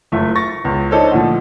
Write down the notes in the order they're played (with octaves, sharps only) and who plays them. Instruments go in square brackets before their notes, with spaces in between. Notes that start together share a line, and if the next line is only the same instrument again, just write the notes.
[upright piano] F#1 A3 F4 E5
C#6 A6 A#6
C#2 B3
D4 D#4 A4 C5 C#5
D2 A#2 F3